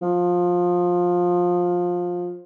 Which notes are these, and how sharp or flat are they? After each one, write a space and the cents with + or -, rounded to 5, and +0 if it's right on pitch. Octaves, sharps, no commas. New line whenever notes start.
F3 +20